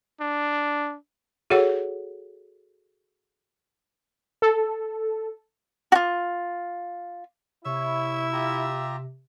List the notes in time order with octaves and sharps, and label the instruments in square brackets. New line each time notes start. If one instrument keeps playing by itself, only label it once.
[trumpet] D4
[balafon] F#4 G#4 A4 C#5 F#5
[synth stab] A4
[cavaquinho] F4 F#4
[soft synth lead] C3 [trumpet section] E4 [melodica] C#5 [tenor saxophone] E5
[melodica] F4 G4 A#5